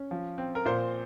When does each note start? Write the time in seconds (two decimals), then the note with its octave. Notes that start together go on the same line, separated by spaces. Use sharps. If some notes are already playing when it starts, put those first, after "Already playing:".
Already playing: C#4
0.11 F3
0.38 C4
0.55 A#4
0.65 A#2 C5